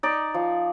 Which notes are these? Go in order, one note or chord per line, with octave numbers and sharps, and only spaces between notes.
D#4 D5
F3